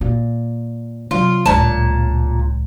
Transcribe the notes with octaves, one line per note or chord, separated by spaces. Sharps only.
A#2
C3 F#3 F4
D1 C#2 A#2 A5